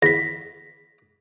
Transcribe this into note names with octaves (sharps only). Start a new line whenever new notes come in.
E2 A#6 B6